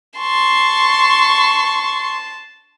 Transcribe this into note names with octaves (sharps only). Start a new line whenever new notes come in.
A5 C6 C#6